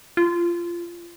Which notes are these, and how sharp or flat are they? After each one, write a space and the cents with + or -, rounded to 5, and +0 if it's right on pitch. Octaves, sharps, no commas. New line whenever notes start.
F4 -20